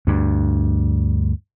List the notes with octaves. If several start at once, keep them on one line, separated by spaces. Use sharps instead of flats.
D2 G2